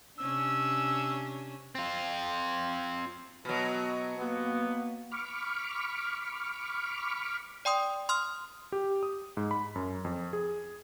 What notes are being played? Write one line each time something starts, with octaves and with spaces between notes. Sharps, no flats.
C3 C#4 D4 E6
C4 F4
B2 F#3 B3 D#5
A#3 B3 F#4
B5 C#6 D6 F6
D5 G5 C6 D#6
C6 D#6 F6
G4
D#6
G#2
B5
F#2
F2
G#4